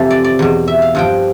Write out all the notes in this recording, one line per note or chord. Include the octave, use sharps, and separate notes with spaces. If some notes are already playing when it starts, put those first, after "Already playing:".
Already playing: F2 C3 E3 A4 C5
D5
D5
E2 B2
E5
F5
G2 F3 G5